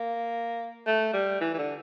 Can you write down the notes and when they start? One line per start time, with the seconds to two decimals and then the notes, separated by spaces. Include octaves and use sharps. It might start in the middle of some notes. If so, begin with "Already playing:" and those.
Already playing: A#3
0.87 A3
1.13 G3
1.41 E3
1.54 E3
1.58 D3